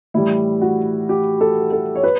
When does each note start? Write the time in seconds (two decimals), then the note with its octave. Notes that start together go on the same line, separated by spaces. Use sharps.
0.14 A2 E3 G3 E4
0.61 F#4
1.09 G4
1.41 A4
1.72 A4
1.96 C#5
2.03 B4